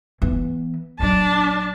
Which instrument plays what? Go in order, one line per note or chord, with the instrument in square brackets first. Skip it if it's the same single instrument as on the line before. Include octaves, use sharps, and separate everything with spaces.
[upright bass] E3 B3
[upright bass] A#1 F#3 [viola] D4 A5